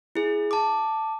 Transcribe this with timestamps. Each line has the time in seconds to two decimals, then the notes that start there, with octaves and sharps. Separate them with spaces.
0.15 E4 G#4
0.51 A5 D6